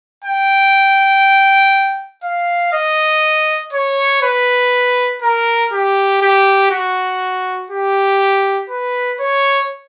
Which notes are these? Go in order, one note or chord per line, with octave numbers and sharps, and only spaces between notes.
G5
F5
D#5
C#5
B4
A#4
G4
G4
F#4
G4
B4
C#5